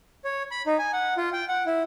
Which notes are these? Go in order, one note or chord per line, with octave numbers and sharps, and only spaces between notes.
C#5
B5
D#4
G#5
F#5
F4
G5
F#5
E4